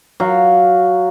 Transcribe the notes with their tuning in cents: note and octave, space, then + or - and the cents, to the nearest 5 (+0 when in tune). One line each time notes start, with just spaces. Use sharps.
F#3 +0 F5 +0